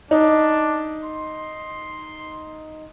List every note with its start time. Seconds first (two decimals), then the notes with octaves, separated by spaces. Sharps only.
0.11 D4 D#4
1.04 C6